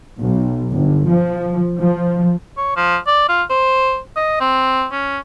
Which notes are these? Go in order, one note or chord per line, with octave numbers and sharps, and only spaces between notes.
B1
G1
F3
F3
C#5
F3
D5
F4
C5
D#5
C4
C#4